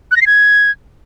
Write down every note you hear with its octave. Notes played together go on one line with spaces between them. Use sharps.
F#6
A#6
C7
G#6